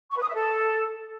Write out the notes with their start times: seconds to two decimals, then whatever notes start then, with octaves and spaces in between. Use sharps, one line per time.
0.11 C#6
0.17 B4
0.23 D#6
0.29 E5
0.35 A4